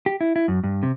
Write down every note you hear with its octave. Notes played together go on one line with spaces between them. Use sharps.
G4
E4
E4
F#2
G2
C3